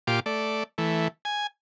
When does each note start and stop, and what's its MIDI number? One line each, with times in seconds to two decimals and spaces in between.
0.07 0.20 46
0.07 0.20 65
0.07 0.20 67
0.07 0.20 86
0.26 0.63 57
0.26 0.63 74
0.78 1.08 52
0.78 1.08 57
1.25 1.47 80